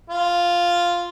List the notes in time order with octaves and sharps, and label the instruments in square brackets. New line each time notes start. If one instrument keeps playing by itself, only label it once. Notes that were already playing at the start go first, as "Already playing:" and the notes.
[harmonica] F4